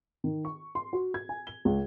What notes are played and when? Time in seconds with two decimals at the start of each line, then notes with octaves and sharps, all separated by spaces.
0.24 D#3
0.45 C#6
0.75 C6
0.93 F#4
1.14 G#6
1.29 G#5
1.47 G7
1.65 C#2